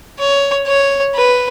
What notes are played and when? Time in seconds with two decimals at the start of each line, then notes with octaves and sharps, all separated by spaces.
0.19 C#5
0.67 C#5
1.15 B4